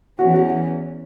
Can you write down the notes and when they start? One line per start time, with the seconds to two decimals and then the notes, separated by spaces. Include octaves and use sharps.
0.19 E2 E3 C#4 F#4
0.34 F#4